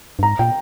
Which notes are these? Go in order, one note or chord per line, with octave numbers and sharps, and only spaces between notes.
G2
G#2 A#5
A#2 G5